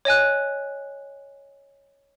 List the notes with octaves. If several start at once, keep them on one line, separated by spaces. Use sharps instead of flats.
C#5 D#5 G#5 F#6